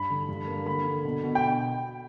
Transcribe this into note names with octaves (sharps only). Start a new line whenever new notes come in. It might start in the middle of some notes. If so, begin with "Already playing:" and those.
Already playing: G2 B5
D3
G2
A#3
D3 B5
D3
B2
B2
G5